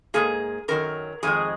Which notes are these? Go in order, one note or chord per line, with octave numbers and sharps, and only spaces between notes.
G#2 F3 A#3 G#4
F#2 D#3 F#3 A#4
F2 D#3 G#3 G#4